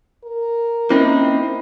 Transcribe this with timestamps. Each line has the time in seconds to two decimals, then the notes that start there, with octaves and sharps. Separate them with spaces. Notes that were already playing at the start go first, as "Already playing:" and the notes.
0.24 A#4
0.90 A#3 C4 C#4 D#4 E4